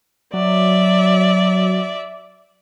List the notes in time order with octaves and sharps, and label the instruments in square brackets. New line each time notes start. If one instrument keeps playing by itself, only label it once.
[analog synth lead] F#3 [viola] D5 E5